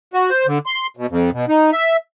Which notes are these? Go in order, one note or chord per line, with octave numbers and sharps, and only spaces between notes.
F#4
C5
D3
C6
B2
F2
B2
D#4
E5